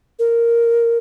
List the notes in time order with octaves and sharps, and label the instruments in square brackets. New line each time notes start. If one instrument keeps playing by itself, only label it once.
[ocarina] A#4